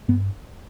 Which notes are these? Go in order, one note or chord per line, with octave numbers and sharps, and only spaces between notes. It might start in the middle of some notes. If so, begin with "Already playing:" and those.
G2 B3